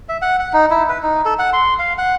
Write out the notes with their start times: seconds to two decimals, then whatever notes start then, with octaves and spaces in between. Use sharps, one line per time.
0.09 E5
0.22 F#5
0.40 F#5
0.53 D#4
0.71 E4
0.89 B4
1.03 D#4
1.25 A4
1.39 F#5
1.53 C6
1.79 F5
1.98 F#5